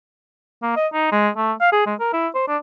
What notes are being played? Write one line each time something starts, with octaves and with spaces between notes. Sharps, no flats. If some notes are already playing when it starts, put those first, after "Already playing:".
A#3
D#5
D#4
G#3
A3
F5
G#4
G#3
A#4
E4
C5
D4